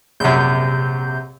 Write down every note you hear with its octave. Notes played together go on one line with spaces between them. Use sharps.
A#1 F#2 C3 G6